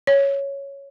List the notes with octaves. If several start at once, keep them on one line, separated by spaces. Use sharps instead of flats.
C#5